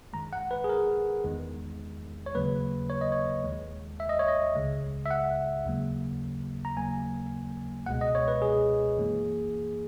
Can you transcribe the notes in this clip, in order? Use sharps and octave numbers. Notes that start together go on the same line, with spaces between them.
F#2 D#3 G#3 A#5
F#5
B4
G#4
A#4
E2 D#3 G#3
C#5
D#2 C#3 F#3 A#3 B4
C#5
D#5
C#5
D#2 D#3 G#3
E5
D#5
C#5
D#5
C#2 C#3 G#3
E5
F#5
D#2 C#3 F#3 A#3
A#5
D#2 C#3 F#3 A#3 G#5
C#2 B2 G#3 F#5
D#5
C#5
B4
G#4
F#2 E3 A#3